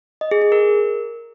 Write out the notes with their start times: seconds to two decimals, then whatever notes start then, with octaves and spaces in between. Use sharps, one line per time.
0.21 D#5
0.31 G#4
0.42 G#4
0.52 A#4